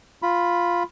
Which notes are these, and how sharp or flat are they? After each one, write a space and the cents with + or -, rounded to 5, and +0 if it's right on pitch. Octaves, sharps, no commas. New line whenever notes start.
F4 +0 B5 +0